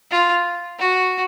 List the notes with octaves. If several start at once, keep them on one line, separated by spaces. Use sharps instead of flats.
F4
F#4